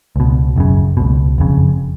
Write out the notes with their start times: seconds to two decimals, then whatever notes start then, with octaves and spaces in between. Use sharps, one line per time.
0.16 C#2 B2
0.56 F#1 F#2 C#3
0.97 C#2 B2
1.38 F#1 F2 C#3